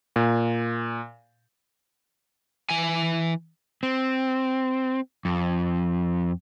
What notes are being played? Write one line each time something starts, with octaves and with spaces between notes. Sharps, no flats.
A#2
E3 G#5
C4
F2